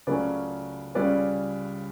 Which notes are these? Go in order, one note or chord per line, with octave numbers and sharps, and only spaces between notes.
C#2 C#3 F#3 A3 C#4 B4 D5
C#2 C#3 G3 C#4 B4 D5